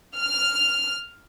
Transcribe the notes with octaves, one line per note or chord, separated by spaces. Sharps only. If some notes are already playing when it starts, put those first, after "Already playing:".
F6